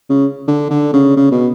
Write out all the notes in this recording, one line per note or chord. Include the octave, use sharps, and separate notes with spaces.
C#3
D3
D3
C#3
C#3
B2